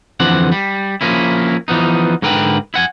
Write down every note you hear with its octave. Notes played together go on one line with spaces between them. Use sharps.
F2 D3 E3 C4 D5 F#5
G3
F3 A#3 C#4 E4
E3 F3 B3 D#4
G#2 D3 A#4 B4 G5
E4 F#5 G#5